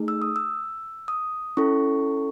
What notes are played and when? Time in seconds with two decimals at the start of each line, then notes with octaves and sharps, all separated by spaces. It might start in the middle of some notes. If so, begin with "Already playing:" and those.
Already playing: A3 D#4 G#4
0.08 E6
0.22 D#6
0.36 E6
1.08 D#6
1.57 C#4 E4 A4 C#6